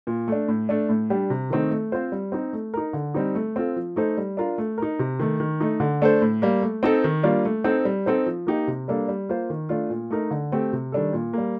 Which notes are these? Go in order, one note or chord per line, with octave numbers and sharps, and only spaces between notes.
A#2
A3 D4
A2
A3 D4
A2
G3 D4 G4
C3
D#3 A3 C4 D#4
A3
C4 F4 C5
G3
C4 D#4
A3
D#4 A#4
D3
G3 C4 D#4
A3
C4 F4 A4
F3
A3 D#4 A4 C5
G3
D4 F4 A#4
A3
D#4 A#4
C3
D#3 A3
D#3
A3 D#4
D3
A3 D4 A4 C5
A2
G3 A#3
A3
C4 D#4 A4 C5
D#3
G3 A#3 D4 F4
A3
C4 D#4 A4 C5
G3
C4 D#4 A4 C5
F3
A#3 D#4 G4
C3
G3 A#3 D4 A4
G3
A#3 F4 C5
D#3
A3 D4 F4
A#2
A3 D#4 A#4
D3
A3 C4 G4
C3
D#3 G3 D4 A4
A#2
G3 A#3